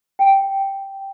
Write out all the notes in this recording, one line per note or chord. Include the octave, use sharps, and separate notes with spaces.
G5